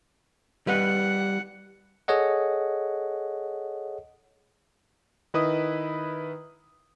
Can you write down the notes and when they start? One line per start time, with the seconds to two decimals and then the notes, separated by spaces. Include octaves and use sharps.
0.67 G3 B4 D#5 F#5
2.08 G#4 A4 C#5 D#5 F#5
5.34 D#3 E4 B4 D#5 D#6